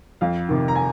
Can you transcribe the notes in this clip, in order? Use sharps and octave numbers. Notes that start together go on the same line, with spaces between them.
F2 F5
C3 D#3
A#5
G#5